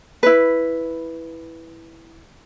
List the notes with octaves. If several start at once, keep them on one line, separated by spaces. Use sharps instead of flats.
E4 B4